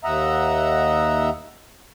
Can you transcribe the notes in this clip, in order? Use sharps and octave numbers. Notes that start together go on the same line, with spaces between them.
D#2 D#5 E5 F#5 A#5